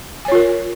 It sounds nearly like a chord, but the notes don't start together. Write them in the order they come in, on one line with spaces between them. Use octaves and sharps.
G#5 C#5 F4 A#4